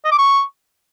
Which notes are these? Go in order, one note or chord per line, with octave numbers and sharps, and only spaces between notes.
D#5
D6
C#6